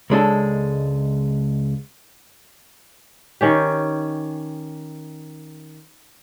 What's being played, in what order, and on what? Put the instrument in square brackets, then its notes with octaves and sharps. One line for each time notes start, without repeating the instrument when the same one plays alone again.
[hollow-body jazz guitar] C#2 G#3 D4 A4
[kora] D#3 C#4 G4